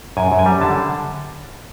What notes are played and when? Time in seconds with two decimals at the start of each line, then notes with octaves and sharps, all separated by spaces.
0.17 F#2 G#5
0.32 F#2
0.39 G#5
0.46 G3
0.61 D3 A5